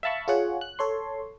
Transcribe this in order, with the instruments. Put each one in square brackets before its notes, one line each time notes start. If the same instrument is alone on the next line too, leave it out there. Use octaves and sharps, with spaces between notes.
[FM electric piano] E5 F5 A5 B5 C#6
F4 G#4 C#5 F#5
F#6
A4 C#5 C6